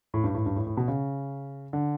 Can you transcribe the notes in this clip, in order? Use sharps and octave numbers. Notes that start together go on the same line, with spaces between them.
A2
G2
A2
G2
A2
A2
B2
C#3
D3